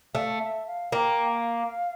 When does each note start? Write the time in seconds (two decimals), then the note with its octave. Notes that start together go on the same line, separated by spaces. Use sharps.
0.15 A3 F5
0.41 E5
0.67 F5
0.92 A#3 G5
1.31 F5